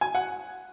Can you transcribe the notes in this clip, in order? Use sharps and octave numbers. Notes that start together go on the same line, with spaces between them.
G#5
F#5